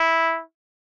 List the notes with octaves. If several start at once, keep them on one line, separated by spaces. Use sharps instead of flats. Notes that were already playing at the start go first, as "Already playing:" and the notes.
Already playing: E4